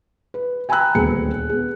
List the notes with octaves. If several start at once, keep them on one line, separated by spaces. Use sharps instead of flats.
B4
G5 G#5 A#5 B5 E6 F#6
D#1 D2 B3 G#4 C#7
B3 G#4